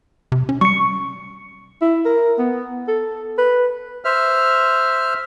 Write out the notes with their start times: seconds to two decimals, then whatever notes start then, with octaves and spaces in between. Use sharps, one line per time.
0.32 C3
0.49 C#4
0.61 G3 C#6 C#7
1.81 E4
2.05 A#4
2.38 B3
2.88 A4
3.38 B4
4.04 C5 E5 F6